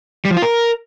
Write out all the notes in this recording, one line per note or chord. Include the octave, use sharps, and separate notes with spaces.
G3
F3
F4
A#4